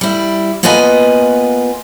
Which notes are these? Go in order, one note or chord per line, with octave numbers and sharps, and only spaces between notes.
G3 E4
A#3 B3 F4 B4 D#5 G#5